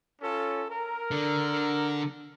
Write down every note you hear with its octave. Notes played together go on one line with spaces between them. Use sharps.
C#4 F4 A4
A#4
D3